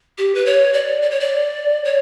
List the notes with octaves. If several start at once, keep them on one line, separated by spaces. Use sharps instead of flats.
G4
B4
C#5
D5
D5
C#5
D5
C#5